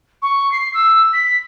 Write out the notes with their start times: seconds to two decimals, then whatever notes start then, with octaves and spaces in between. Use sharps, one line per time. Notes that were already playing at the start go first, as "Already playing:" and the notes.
0.22 C#6
0.52 C7
0.74 E6
1.13 B6